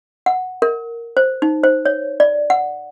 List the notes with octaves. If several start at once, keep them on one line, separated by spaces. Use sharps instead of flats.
F#5
A#4
C5
D#4
C5
C#5
D5
F#5